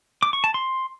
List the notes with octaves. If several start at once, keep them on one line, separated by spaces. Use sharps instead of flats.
D6
C#6
A5
C6